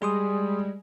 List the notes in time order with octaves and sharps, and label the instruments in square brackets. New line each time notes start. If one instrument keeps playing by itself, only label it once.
[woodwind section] G3 [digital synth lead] G#3 [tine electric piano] G#4 C6 D#6